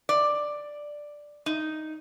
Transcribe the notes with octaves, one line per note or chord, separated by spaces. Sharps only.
D5
D#4